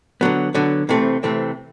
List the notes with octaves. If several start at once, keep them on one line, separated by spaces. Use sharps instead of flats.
D3 F#3 B3
D3 F#3 B3
C3 E3 A3 C4
C3 E3 A3 C4